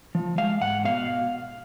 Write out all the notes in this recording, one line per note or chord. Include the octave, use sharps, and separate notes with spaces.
F3
G#3 F5
G#2 F#5
B2 F5